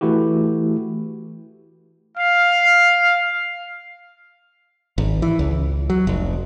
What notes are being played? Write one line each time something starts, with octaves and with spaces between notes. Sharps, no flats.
E3 A3 E4 F#4 G4
F5
G#1
E3
C#2
F#3
F1